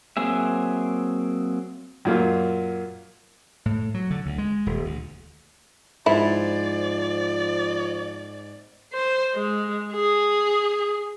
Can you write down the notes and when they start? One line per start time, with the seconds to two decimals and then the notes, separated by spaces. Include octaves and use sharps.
0.17 F#3 A#3 C4 G#4 E5
2.05 F#2 A#2 A#3 F4
3.66 A2
3.94 F#3
4.11 D3
4.26 D2
4.38 G#3
4.66 D#1
4.85 D2
6.06 G#2 F3 E4 D5
8.93 C5
9.35 G#3
9.93 G#4